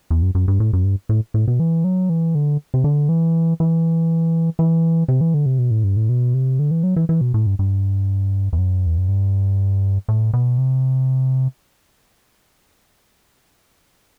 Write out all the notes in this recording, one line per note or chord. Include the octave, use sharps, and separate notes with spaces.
E2
F#2
F#2
G2
A2
F#2
G2
A2
A2
B2
E3
F#3
E3
D3
C3
D3
E3
E3
E3
C3
E3
D3
C3
B2
A2
G2
A2
B2
C3
D3
E3
F#3
E3
E3
B2
A2
G2
G2
E2
F#2
E2
F#2
G2
A2
B2
C3